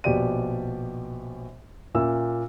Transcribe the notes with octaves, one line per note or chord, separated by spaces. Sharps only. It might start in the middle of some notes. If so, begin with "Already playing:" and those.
A#1 B2 G4 D5 D#7
A#2 A#3 C#4 E5 E6